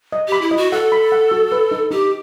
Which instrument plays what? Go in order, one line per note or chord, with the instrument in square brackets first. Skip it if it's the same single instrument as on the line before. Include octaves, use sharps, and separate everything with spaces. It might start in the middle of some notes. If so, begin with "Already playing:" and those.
[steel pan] D#5
[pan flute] G4 [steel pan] B5
[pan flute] E4
[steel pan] D#5
[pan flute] F#4
[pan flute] A4 [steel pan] F#5
[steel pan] B5
F#5
F#4
B4
D#4
[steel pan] D#4 [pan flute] G4